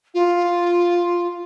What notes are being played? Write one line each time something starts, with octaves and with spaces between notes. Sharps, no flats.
F4